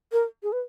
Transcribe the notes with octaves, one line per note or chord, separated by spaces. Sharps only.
A#4
G#4
B4